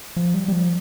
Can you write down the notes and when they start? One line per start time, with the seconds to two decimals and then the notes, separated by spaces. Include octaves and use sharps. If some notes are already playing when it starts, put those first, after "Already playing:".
0.16 F3
0.34 G3
0.48 G3
0.52 F3